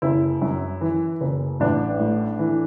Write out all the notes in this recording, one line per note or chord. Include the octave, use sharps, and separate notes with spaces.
F#1 E4
F#2
E3
F#1
A1 D4
A2
E3